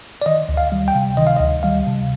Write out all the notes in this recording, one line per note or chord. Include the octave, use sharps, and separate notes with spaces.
D5
D#3 D#5
D2
F5
G3
G5
C3
D#3 D#5
F5
D#5
D2
G3 F5
C3